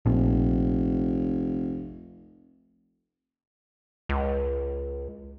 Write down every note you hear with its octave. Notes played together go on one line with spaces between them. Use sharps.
F1 A#1
C#2